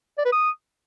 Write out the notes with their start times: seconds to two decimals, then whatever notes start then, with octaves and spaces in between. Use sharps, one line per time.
0.18 D5
0.25 B4
0.33 D#6